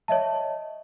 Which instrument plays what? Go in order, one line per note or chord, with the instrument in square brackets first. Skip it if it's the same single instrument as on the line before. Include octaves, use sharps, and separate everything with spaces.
[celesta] C#5 D#5 E5 A5